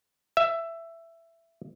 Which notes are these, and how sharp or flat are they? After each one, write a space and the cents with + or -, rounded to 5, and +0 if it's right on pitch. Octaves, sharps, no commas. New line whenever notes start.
E5 +15